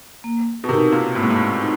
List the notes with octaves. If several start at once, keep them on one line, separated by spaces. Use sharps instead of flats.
A#3
B2
C3 D#4 G4 A#4
A#2
A2 A#3
G#2
A2
D#4